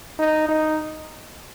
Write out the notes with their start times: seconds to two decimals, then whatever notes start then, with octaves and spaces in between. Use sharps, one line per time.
0.19 D#4
0.49 D#4